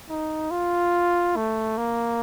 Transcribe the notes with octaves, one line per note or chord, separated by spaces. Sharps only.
D#4
F4
A3
A#3